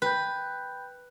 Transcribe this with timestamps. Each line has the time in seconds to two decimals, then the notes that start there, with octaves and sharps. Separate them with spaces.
0.02 B4 G5 B5 G6